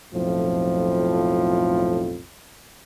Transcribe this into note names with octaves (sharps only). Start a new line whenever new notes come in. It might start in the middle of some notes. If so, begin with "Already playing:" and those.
B1 F2 A2 F3